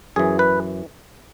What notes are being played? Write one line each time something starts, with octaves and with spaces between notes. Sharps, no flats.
F#2 E3 G#4
B4